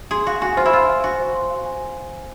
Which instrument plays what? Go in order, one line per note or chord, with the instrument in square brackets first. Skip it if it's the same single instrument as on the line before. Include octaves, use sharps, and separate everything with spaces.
[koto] G#4 [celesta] C6
[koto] F#4 [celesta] F5
[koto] F#4 [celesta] G#5
[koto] F4 [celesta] C5
[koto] E4
[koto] F4 [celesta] C6
[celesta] F5
[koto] F#4 [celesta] G#5
[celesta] C5
C6
F5
G#5